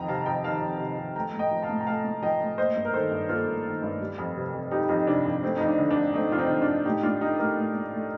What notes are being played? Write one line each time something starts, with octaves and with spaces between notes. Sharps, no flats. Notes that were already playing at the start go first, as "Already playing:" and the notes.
Already playing: F2 D#3 D#5 G5 A#5
C3 F5 A5
F2 G5 A#5
D#3 F5 A5
F2
C3
F2
A3 G5 A#5
A2
D#5 G5
F3
F5 A5
A2
A#5
A3 F5 A5
A2
F3 D#5 G5
A2
A#3 C5 D#5
G2
A#4
D#3 A4 C5
G2
A#3 F4 A4
G2
D#3
G2
G3
F2
C3
F2
G3 D#4 G4
F2 D#4 G4
C3 D4
F2
A3 C4
F2 D#4
D4
D3
D4
F2
A3 C4 D#4
F2 F4
C4 D#4
D3
D4 F4
F2
A2 D#4 G4
A2 D4 F4
A3 D#4 G4
A3 G4 A#4
A2
A2
A3